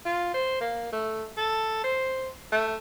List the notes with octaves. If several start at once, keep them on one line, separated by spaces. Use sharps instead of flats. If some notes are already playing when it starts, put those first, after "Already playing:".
F4
C5
A#3
A3
A4
C5
A3